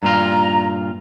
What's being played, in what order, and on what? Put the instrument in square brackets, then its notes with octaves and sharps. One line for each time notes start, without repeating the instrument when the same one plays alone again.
[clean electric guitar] G2 A#2 F4 [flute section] A#5